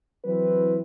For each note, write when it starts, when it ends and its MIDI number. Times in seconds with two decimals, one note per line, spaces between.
0.25 0.79 52
0.25 0.79 54
0.25 0.79 60
0.25 0.79 64
0.25 0.79 71